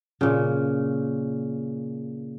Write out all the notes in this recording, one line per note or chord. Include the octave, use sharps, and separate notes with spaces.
A#2 C#3